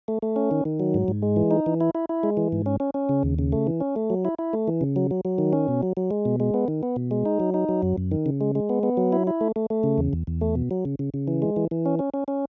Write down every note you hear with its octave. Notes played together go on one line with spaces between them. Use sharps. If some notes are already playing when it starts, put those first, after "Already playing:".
A3
A3
C#4
D#3
D#3
F#3
G#2
G#2
G#3
E3
D#4
E3
E4
E4
E4
G#3
E3
G#2
C#4
C#4
C#4
C#3
D#2
C#3
A3
E3
C#4
A3
F#3
E4
E4
A3
E3
C#3
F#3
F#3
F#3
D#3
C#4
B2
F#3
F#3
G#3
B2
G#3
B3
D#3
B3
B2
G#3
D#4
F#3
D#4
F#3
F#2
F#2
D#3
C#3
G#3
G#3
B3
B3
F#3
E4
E4
A3
A3
A3
C#3
E2
E2
E2
A3
B2
F#3
C#3
C#3
C#3
E3
G#3
E3
E3
C#4
C#4
C#4
C#4